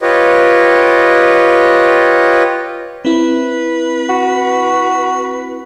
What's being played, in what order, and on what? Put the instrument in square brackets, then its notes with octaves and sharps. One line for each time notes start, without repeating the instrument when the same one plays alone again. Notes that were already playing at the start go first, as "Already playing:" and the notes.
[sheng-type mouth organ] F4 G4 B4 C#5 D#5
[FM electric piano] C4 E4 [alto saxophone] B4
[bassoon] F#4